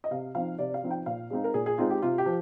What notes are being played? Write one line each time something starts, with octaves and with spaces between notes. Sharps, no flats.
D#5
C3 F5
F3 C4 D#4 F5
C3 D5
F5
F3 C4 D#4
G5
A#2 F5
G#3 C4 D#4
A#4
A#2 G#4
G#4
G#3 C4 D#4 F4
G4
C3 F4
G4
F3